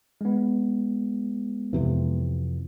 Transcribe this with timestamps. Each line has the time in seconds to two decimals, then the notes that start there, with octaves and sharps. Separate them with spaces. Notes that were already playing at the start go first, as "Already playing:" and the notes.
0.21 G#3 B3
1.73 F2 C3 E3